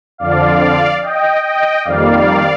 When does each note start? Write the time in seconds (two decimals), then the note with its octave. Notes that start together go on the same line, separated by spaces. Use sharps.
0.18 F2 D3 F3 D5 F5
1.02 D#5 G5
1.43 D#5 G5
1.84 F2 D#3 G3 A#3 D5 F5